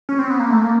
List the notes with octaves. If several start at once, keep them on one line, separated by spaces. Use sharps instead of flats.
C#4
C4
B3
A#3
A3
A#3